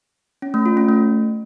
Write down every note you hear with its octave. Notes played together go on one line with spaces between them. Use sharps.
C#4
A3
F4
C#4
A3